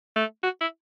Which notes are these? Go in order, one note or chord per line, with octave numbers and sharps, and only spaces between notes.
A3
F#4
E4